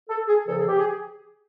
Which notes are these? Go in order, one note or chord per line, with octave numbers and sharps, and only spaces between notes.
A4
G#4
E2 C#3 F3 A4
G#4
G4
G#4